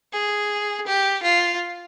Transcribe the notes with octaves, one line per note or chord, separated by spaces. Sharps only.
G#4
G4
F4